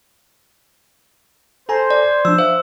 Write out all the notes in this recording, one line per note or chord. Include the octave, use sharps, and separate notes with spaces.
A4 C5 G#5 A#5
D5
F3 D4 E6
C5 E5 F5